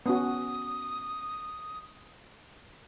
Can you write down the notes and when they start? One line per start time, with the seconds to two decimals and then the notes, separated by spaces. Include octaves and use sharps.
0.06 B3 C#4 F#4 D#6